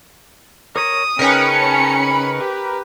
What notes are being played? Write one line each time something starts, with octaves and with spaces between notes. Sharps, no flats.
A#4 C#5 A#5 D#6
C#3 C#4 D#4 A#4 B4 G5 C#7
A5
B5
G4